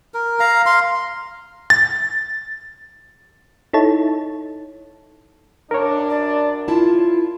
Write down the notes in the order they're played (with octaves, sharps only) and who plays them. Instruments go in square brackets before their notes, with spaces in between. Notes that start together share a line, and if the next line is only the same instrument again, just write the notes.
[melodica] A#4
F5 A#5
F5 C6
[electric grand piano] A6
[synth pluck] D#4 E4 A4 C#5 A5
[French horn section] F#2 D4 [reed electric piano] A#4 C#5
[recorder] D5
[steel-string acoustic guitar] E4 A5 [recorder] F4